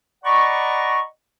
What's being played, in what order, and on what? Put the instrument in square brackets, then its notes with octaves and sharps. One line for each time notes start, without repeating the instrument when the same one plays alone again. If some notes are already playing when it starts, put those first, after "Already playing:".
[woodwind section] D5 D#5 F#5 A#5 B5 C#6